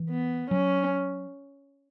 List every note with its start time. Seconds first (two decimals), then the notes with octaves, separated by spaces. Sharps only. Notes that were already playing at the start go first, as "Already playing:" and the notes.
Already playing: E3
0.10 B3
0.50 F#3 C#4